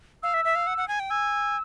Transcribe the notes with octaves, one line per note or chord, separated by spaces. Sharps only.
F5 E6
E5
E5
F5
F#5
F#5
G#5
G5
G#5 E6